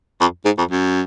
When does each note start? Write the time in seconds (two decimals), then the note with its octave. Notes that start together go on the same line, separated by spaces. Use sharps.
0.21 F2
0.45 G#2
0.58 F2
0.71 F#2